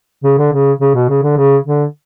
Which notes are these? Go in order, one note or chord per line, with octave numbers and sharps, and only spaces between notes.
C#3
D3
C#3
C#3
B2
C#3
D3
C#3
D3